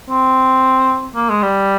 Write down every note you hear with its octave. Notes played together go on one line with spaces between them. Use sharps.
C4
A#3
G#3
G3